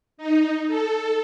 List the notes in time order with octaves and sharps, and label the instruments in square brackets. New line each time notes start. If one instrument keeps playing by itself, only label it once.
[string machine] D#4
A4